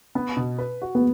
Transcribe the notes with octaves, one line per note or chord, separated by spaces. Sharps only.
B3
B2
B4
F#4
B3